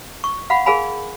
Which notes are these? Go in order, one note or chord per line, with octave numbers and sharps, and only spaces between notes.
C#6
F5 F#5 B5
G#4 A#4 F5 G#5 B5